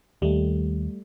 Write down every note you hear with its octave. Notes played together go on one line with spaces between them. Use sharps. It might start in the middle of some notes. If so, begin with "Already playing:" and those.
D#2 G3 A3